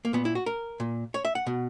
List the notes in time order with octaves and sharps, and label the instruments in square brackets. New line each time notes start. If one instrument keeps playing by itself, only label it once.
[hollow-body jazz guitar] A#3
A#2 B3
E4
F#4
A#4
A#2
C#5
E5
F#5
B2